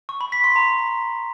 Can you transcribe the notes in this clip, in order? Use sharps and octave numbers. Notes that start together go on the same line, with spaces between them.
C#6
B5
B6
C6
A#5